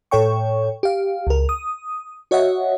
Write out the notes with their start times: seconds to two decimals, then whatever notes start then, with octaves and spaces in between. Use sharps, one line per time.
0.11 A2 A4 C#5 G5 C#6
0.83 G4 F5
1.27 C#2 A#4
1.49 D#6
2.31 F#4 C#5 D#5 E5 F#5